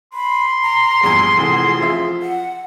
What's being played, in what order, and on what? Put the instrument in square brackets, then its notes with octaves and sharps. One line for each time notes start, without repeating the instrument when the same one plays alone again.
[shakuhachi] B5 [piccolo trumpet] C6
[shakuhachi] A#5
[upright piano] A#1 E2 G2 [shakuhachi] G#4
[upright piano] F1 F2 E3
F3 F4 E5
[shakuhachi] F#5